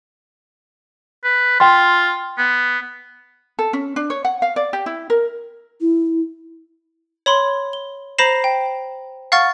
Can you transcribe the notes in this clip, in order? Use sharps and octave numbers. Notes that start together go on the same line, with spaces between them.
B4
F4 G5 C6
B3
A4
C#4
D4
C#5
F#5
F5
D5
G4
E4
A#4
E4
C#5 B5 C6
G7
C5 A#5 B5 A#6 C7 E7
G5
F5 F#5 C#6 F6 A6